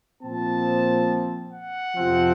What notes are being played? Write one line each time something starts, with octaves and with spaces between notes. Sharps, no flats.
A#2 F3 C4 A5
F#5
F2 C3 F3 C4